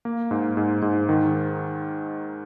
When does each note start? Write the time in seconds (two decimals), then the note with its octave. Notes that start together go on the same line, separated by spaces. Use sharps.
0.05 A#3
0.31 G#2
0.57 G#2
0.82 G#2
1.09 D#3